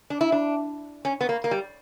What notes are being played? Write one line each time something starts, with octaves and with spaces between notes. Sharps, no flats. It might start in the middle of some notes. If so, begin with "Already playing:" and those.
D4
E4
D4
C#4
B3
A#3
A#3
G3